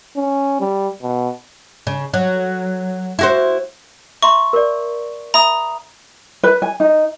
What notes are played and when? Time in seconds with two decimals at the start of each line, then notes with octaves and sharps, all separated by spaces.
0.16 C#4
0.60 G3
1.02 B2
1.87 C#3
2.14 F#3
3.19 E4 F#4 C5
4.22 E5 A#5 C6 C#6
4.53 A#4 D5
5.34 E5 A#5 B5 D#6
6.43 B4
6.62 G#5
6.80 D#4